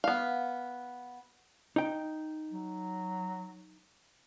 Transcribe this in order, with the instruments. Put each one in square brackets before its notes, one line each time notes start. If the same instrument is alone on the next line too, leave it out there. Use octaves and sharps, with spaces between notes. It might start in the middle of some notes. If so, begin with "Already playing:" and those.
[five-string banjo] B3 F5
[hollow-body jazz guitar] D#4 G5
[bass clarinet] F#3